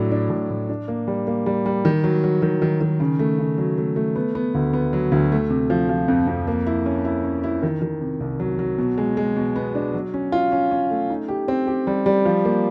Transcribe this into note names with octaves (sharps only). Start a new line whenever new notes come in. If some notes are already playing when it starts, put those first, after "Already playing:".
Already playing: A2 F#3 D4
D4
A2
A2
D4
A#3
G3
A#3
G3
G3
D#3
F#3
F#3
D#3
D#3
D#3
C#3
A3
C#3
F#3
A3
A3
B3
B3
D2
B3
F#3
D2
A3
C3
F3
F3
F2
F2
A#3
E4
C#4
E4
C#4
E4
D#3
D#3
C3
C2
F#3
F#3
B2
G#3
G#3
B2
B3
D4
F#3
C#4
F4
C#4
C#4
A3
D#4
G4
C4
G4
G3
G3
F3
A#3